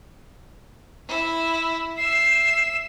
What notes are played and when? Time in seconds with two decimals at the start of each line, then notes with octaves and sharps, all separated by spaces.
1.08 E4
1.98 E5 C7 E7